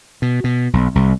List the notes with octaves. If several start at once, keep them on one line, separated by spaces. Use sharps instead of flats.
B2
B2
B1
C2